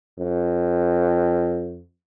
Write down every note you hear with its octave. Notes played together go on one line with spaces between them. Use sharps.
F2